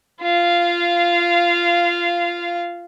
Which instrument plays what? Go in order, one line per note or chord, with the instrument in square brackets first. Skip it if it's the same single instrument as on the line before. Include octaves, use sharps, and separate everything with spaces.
[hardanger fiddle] F4 F5